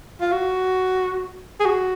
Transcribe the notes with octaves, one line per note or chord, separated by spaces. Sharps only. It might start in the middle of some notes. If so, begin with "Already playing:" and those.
F4
F#4
G#4
F#4